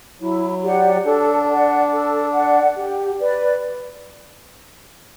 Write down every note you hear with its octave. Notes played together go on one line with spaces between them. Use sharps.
F#3 E4
G4 D5 F#5
D4 A4
D5 F#5
A4
D5 F#5
G4
B4 D5